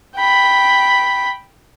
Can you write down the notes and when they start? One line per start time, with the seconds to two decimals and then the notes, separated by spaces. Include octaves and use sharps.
0.16 G5 B5